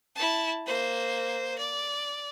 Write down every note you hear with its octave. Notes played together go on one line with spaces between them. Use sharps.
E4 A5
A#3 C5
D5